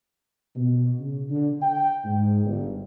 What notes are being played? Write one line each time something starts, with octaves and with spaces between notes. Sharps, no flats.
B2
C#3
D3
G5
G#2
G1